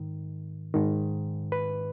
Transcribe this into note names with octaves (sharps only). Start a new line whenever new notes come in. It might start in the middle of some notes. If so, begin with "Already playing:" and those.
Already playing: G#2 D#3
G#2 D#3
B4